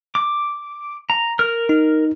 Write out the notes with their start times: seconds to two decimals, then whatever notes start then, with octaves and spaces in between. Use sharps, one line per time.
0.15 D6
1.10 A#5
1.39 A#4 F6
1.69 D#4